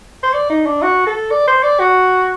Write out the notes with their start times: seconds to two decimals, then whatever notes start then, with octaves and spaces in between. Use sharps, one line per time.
0.23 C5
0.34 D5
0.50 D#4
0.66 D4
0.82 F#4
1.07 A4
1.31 D5
1.48 C5
1.63 D5
1.80 F#4